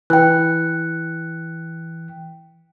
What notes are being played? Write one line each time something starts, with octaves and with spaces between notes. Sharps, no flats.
E3 G5 F#6